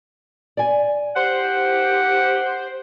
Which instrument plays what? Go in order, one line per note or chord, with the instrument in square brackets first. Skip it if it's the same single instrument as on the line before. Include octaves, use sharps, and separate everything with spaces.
[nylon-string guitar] D5 G#5
[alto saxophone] G4 [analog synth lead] C5 [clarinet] F#5